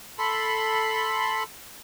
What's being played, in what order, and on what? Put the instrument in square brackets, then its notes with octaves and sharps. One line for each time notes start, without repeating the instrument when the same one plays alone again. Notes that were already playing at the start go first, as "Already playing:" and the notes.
[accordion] A4 B5 C6